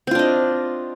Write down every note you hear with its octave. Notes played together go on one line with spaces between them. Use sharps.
C4 D4 F4 D#5